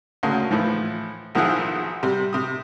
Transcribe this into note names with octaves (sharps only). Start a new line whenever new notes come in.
D2 C#3 A#3
A2 E3 F3
B1 D#3 F3 E4 G#4 F#5
C3 G3
C3 D#6